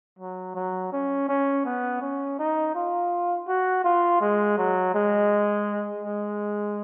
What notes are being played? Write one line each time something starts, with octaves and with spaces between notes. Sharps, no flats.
F#3
F#3
C#4
C#4
B3
C#4
D#4
F4
F#4
F4
G#3
F#3
G#3
G#3